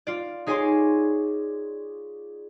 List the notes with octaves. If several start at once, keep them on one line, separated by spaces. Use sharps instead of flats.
F4 D5
D#4 G#4 C#5 G#5 C6 D6